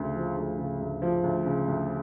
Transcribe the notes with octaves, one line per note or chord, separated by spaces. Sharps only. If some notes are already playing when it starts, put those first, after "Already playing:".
Already playing: D2 C#3
F3
D2
C#3
D2
F3
D2
C#3
D2